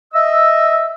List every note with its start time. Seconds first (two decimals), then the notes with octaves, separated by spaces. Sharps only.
0.13 D#5 E5 E6